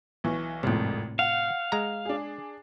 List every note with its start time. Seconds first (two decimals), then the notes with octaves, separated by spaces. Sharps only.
0.24 B1 E3 C#6
0.63 G#1 F2 A2 C3
1.19 F5 F#5
1.72 G#3 A#5
2.05 D4 G#4